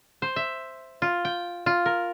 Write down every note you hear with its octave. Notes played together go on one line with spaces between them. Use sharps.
C5
E5
F4
G5
F4
A#4